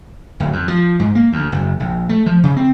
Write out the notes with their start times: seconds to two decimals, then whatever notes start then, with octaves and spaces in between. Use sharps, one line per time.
0.40 D1
0.53 F2
0.68 F3
0.99 G#2
1.15 A#3
1.32 D2
1.52 F#1
1.80 A#1
2.09 A3
2.26 F3
2.43 C#3
2.56 C4